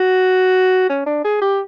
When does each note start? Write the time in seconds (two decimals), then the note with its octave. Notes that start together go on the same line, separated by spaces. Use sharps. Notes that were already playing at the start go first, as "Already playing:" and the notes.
Already playing: F#4
0.89 C#4
1.06 D4
1.24 G#4
1.41 G4